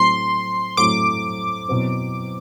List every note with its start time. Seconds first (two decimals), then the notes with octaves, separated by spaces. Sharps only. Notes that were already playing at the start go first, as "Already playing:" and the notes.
Already playing: A2 F#3 A3 C4 C6
0.77 A2 F#3 A3 C4 D6
1.68 B2 F#3 C4 E4